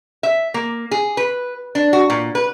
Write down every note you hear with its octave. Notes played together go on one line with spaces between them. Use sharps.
E5
A#3
G#4
B4
D4
F#4
A#2
B4